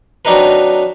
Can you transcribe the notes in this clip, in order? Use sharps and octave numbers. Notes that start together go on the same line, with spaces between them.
F#3 C4 D4 D#4 A#4 B4